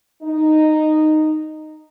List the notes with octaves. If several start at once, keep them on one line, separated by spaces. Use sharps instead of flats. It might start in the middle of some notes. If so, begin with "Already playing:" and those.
D#4